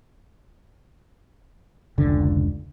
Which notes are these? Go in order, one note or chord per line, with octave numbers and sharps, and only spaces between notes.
F1 C#2 D3